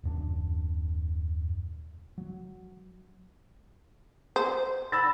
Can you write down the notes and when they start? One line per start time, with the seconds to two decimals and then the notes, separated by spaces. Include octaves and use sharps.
0.03 D#1 F#2 D4
2.18 F#3
4.36 C5
4.92 B5 E6 A6